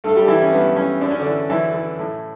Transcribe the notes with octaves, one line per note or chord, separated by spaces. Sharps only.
G2 A3 A4
G3 G4
E3 E4
C#4
G2 B3
E3 C#4
F#2 D4
C#4
D3 D4
E3
F#2 E3 E4
E3
A2